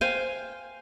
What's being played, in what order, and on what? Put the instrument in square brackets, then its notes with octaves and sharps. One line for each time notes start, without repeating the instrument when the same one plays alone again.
[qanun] C5 F5 G5 G#5